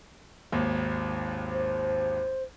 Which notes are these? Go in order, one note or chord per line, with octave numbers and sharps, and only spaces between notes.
G#1 D#2
C5